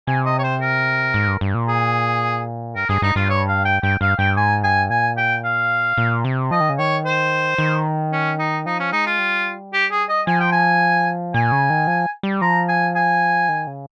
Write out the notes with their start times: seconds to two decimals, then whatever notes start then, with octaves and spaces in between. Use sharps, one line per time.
0.07 C3 G#5
0.25 D#5
0.39 C#5
0.43 C5
0.61 A#4
1.14 G#2
1.28 G2
1.41 G2
1.54 A#2
1.68 G#4
2.75 G2 A#4
2.89 G2 G#4
3.02 G2 D#4
3.16 G2 F4
3.29 C#5
3.48 F5
3.65 G5
3.83 G2 G5
4.01 G2 F5
4.19 G2 G5
4.37 G#2 G#5
4.63 G2 G#5
4.90 A#2 G#5
5.17 G5
5.44 F5
5.98 A#2
6.25 C3
6.51 F3 D#5
6.60 D#3
6.69 C#3
6.78 D#3 C#5
7.05 C5
7.58 D#3
8.12 C#4
8.39 D#4
8.66 F3 D#4
8.79 C#4
8.92 G#3 D#4
9.06 F4
9.19 G3
9.73 G4
9.91 G#4
10.09 D#5
10.27 F3 G#5
10.40 G5
10.52 G#5
11.34 A#2 G#5
11.52 C#3
11.70 D#3
11.87 F3
12.23 G3
12.41 F3 A#5
12.68 G#5
12.95 G#5
13.49 D#3
13.67 C#3